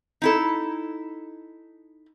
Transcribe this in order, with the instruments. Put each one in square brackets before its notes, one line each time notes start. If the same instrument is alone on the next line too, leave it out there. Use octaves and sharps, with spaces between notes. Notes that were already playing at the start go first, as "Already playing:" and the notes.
[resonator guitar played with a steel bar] D#4 E4 A4